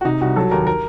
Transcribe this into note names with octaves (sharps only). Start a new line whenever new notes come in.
F#4
C3 D#4
C2 F#4
F#3 A4
D#2 A#4
A#4